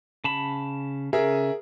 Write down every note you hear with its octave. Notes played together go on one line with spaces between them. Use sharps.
C#3 A5 B5
C#3 G#4 A#4 E5